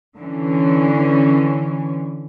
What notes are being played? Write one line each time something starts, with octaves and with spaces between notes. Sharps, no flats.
D3 E3 C#4